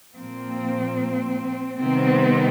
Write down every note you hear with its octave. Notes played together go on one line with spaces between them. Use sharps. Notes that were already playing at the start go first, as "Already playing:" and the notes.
A#2 F3 A#3 C4
C3 D#3 G3 B3 C4